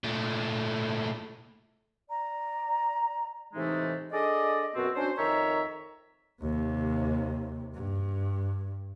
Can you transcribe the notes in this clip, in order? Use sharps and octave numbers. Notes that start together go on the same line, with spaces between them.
A#2 A3
D5 A#5
A2 C3 E3 G#3 A3 D#4
D4 G#4 A4 D5 D#5
F#2 B2 B3 C4 F#4
C#4 D4 F#4 C5
F2 D#3 A#4 C#5 E5 A#5
D#2 C3
G2